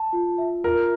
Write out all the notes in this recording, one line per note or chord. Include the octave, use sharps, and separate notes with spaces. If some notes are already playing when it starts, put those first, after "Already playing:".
Already playing: A5
F4
E5
F4 A#4